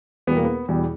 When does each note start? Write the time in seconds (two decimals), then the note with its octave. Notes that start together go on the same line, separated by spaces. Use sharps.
0.27 E2 B2 G3 B3
0.36 A#3
0.45 B3
0.68 E2 B2 G3